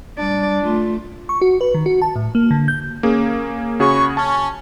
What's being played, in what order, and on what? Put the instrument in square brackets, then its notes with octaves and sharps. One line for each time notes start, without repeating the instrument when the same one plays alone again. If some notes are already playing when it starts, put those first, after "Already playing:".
[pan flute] G3 [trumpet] D4 [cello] D5
[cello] A3 [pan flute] F4
[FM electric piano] C#6
F#4
B4
D#3
F#4
A5
A2
A#3
D3
G6
[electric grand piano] A#3 C#4 G#4
[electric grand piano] C#3 F#4 G#4 [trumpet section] C#5 B5 C#6
[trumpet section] C#4 [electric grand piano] A5